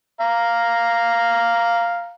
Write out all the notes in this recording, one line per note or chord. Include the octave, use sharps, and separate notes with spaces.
F5 A#5